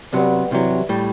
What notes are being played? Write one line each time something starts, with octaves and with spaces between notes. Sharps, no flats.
C2 C3 F#3 G3 B3
C2 C3 E3 F#3 G3
A2 G3